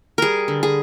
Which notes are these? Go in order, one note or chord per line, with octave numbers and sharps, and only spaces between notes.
G3 G#4 A#4
D3
G#4